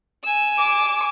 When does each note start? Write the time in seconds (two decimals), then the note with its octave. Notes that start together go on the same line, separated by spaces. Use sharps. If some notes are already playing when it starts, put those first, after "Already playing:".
0.23 G#5 E6
0.57 D6